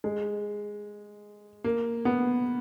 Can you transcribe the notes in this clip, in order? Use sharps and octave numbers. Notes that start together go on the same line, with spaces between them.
G#3
A#3
B3